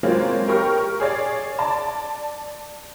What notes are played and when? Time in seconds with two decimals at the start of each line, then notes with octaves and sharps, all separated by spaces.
0.03 F#3 G#3 A#3 C4 F4 C#5
0.48 G4 A#4 G5 C#6 F6
1.00 G#4 C#5 D5
1.59 D5 A5